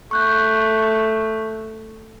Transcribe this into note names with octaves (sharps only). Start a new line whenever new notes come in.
A3 C#6 F#6 G6